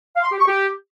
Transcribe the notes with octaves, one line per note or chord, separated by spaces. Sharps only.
F5
C6
G4
C#6
G4